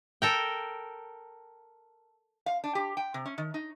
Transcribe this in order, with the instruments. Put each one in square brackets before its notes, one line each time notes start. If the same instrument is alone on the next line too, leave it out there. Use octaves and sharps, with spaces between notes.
[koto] A4 A#4 G5
[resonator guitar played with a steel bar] F5
D4
G4
G5
C3
C#4
D#3
D#4